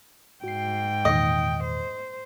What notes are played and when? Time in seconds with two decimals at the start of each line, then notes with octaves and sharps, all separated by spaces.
0.44 G#2 F#4 G5 C7
1.05 E2 A#2 D#3 D#5
1.64 C5